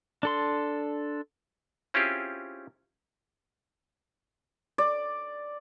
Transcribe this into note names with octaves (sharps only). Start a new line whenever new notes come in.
D4 A4 C6
C4 C#4 E4 F4 G4 G#4
D5